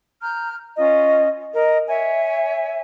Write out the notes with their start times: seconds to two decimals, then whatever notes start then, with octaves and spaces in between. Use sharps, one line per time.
0.22 A#5 F6 G6
0.77 C#4 F4 D#5
1.54 A#4 D#5
1.88 C#5 E5 G#5